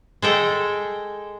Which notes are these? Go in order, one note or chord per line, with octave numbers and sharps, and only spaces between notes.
G#3 A4 G5